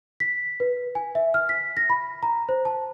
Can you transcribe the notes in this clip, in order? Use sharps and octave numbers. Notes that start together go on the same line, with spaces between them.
B6
B4
G#5
E5
F6
B6
A#6
B5
A#5
C5
A5